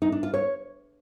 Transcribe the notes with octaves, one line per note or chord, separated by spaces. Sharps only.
D#4
D4
F4
C#5